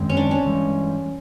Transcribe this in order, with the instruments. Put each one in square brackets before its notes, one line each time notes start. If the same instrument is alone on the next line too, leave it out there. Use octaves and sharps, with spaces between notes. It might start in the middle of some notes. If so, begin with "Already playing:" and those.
Already playing: [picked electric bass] F#2 D#3 G#3 C4
[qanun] C#4
D4
C#4
[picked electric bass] G2 E3 G#3